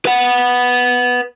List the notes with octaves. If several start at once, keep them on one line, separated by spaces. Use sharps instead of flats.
B4 F#5